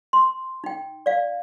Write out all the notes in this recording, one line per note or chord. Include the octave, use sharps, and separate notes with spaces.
C6
D#4 G5
D5 F5